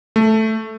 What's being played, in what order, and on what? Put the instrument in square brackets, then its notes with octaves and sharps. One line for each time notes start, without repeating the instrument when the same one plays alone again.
[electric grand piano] A3